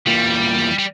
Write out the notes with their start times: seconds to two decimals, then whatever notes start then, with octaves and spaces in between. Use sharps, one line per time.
0.06 E2 E3 G3 A#3 F4
0.79 G3